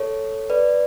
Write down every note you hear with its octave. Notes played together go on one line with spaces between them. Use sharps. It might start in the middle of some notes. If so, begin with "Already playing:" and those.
Already playing: A4 C#5
B4 D5